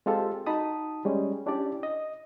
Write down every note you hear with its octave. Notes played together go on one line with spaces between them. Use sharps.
G#3 C4 F4 G4 A4
D#4 F#4 A5 B5 D#6
G3 G#3 C#4
C#4 D4 E4 G4 D5
D#5